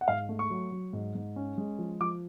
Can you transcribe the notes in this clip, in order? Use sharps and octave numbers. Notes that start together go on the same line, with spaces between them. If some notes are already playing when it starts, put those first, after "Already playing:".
F#5
G#2 F5
A3
C#6
F#3
F#3
G#2
G#2
C#4
G#3
F3
F3 D6